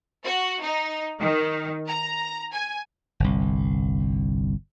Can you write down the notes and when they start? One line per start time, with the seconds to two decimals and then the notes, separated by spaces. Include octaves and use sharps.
0.25 F#4
0.61 D#4
1.20 D#3
1.88 A#5
2.52 G#5
3.20 G1 C2